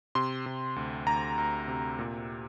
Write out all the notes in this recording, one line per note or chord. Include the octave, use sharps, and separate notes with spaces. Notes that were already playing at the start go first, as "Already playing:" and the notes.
C3 C6
C3
D2
D2 A#5
D2
C3
A#2